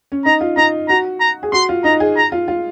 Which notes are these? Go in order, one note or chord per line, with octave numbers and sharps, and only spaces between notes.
C#4
D#4 A#5
F4
D#4 A#5
F#4 A#5
A#5
G#4
F#4 C6
F4
D#4 A#5
G#4
A#5
F4
F4